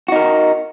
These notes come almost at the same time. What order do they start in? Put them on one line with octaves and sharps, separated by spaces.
F#4 D#4 A#4